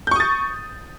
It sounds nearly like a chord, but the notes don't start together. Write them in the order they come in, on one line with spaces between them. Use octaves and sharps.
G6 C#6 D#6 A6